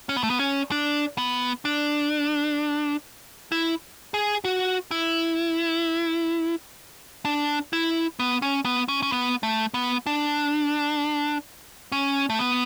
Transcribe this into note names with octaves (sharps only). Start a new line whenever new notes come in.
C#4
B3
A3
B3
C#4
D4
B3
D4
E4
G#4
F#4
E4
D4
E4
B3
C#4
B3
C#4
C#4
B3
A3
B3
D4
C#4
A3
B3